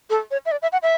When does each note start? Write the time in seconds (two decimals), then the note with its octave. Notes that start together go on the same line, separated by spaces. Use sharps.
0.10 A4
0.31 C#5
0.46 E5
0.51 D5
0.62 E5
0.72 F#5
0.82 E5